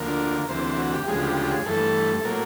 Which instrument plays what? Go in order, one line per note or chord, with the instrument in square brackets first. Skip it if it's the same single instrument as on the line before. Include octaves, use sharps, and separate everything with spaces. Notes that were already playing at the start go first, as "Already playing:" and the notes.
Already playing: [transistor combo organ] D2 D3 F3 A#3 A#4
D2 C3 E3 C5
C5
F#4
G4
D2 C#3 F3 G#3 G#4
G4
G4
G#4
G2 E3 A3 A4
A4
A2 F#3 A#3 A#4